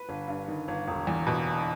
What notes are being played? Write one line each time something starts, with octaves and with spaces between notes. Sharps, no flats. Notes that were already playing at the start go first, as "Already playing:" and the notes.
Already playing: B4
G1
G2
D#3
G1
E1
E2
B2